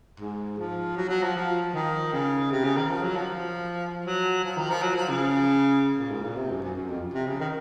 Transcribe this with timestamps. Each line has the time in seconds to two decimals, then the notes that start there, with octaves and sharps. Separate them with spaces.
0.20 G#2
0.58 F3
0.97 F#3
1.09 F#3
1.22 F3
1.36 F3
1.74 D#3
2.13 C#3
2.51 C3
2.64 C#3
2.77 D#3
2.90 F3
3.02 F#3
3.16 F3
4.05 F#3
4.44 F3
4.57 D#3
4.70 F3
4.82 F#3
4.95 F3
5.09 C#3
5.98 A#2
6.11 G#2
6.24 A#2
6.37 C3
6.50 F#2
6.62 F#2
6.75 F#2
6.88 F2
7.14 C3
7.27 C#3
7.40 D#3